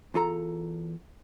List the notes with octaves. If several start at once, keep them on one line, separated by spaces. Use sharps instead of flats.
E2 F4 A4 A#5